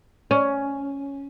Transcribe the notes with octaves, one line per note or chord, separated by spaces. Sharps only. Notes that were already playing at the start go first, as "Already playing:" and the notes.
C#4